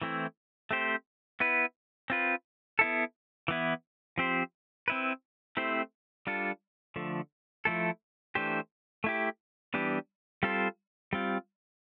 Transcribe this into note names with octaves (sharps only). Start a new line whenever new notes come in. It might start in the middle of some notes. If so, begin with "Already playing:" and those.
E3 A3 C4 E4
A3 C4 G4 C5
B3 E4 B4
C4 F4 B4
B3 E4 A4
E3 B3 E4
F3 C4 G4 C5
C4 E4 B4
A3 C4 E4 G4 C5
G3 D4 F4 A4
D3 F3 A3
F3 A3 E4 A4
E3 A3 D4 G4 C5
A3 E4 G4
E3 G3 B3 D4 G4
G3 C4 F4 A4 C5
G3 C4 F4